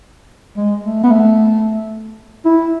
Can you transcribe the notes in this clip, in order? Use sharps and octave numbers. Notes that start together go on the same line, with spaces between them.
G#3
A3
B3
A3
E4